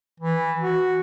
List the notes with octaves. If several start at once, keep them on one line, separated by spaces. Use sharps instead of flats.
E3
F#4